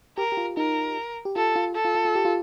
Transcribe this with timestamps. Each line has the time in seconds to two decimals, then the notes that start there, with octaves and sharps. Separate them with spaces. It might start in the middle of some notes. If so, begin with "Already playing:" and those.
0.18 G4 A#4
0.32 G4
0.37 F4
0.57 D#4 A#4
1.25 G4
1.36 F4 A4
1.56 F4
1.75 A4
1.85 F4
1.95 F4
2.05 F4
2.15 G4
2.25 F4